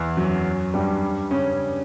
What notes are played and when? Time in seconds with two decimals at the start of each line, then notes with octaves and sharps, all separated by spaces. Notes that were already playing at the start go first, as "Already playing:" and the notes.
Already playing: E2 E3
0.17 F#2 F#3
0.74 G2 G3
1.31 C#3 C#4